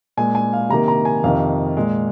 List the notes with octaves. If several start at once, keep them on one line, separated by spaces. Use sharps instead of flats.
A#2 G#3 G#5
G#5
F5
C3 D#3 A#3 A#5
A#5
G#5
F2 C3 D#3 F5
A#2 G#3